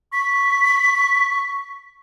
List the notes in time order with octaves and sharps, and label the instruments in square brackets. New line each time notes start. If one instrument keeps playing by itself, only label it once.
[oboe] C#6 [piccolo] B6